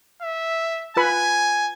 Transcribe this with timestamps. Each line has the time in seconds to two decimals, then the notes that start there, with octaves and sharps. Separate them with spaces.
0.22 E5
0.97 F4 B4 G#5 B5